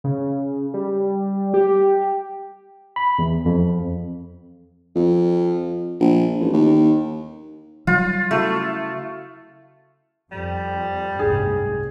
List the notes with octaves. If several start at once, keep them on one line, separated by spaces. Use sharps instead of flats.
C#3
G3
G4
B5
E2
F2
F2
A#1
A1
D#2
F#3 G3 F4
C#3 A3 E4 F#4
F2 G3
F#1 C2 G#2 G#4